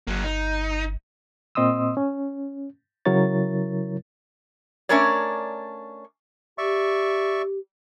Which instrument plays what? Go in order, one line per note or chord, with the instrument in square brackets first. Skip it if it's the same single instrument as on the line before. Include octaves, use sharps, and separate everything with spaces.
[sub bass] G1 [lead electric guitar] F#3 A#3
[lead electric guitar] D#4
[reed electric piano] A#2 C4 D#5 C6 D#6 E6
C#4
C#3 F#3 E4 A#4 C#5 A6
[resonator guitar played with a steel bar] A3 C#4 D4 A#4 C#5 D5
[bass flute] G4 [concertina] D5 E5 C#6